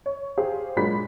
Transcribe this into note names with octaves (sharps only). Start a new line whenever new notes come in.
C#5
G4 G#4 C5 F5
A#2 F#3 G#3 D4 B5 B6